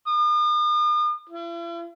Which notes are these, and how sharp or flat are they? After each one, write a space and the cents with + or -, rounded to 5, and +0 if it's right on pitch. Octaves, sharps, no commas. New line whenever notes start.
D#6 -45
E4 +45